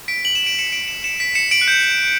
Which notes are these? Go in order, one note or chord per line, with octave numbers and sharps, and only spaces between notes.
B6 D7
F#7
E7
D7
C#7 E7
D7 F#7
C#7 E7
C#7 E7
B6 D7
C#7 E7
D7 F#7
F#6
G6